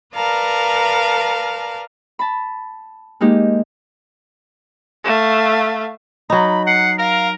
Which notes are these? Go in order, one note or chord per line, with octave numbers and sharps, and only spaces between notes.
A#4 B4 D5 F5 A5 A#5
A5 B5
G#3 A#3 D#4 G4
A3 F5
F#3 D#4 B5
F#5 C7
A#4 F5